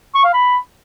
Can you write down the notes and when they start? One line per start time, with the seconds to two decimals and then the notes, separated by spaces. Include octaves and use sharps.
0.15 C#6
0.24 F5
0.33 B5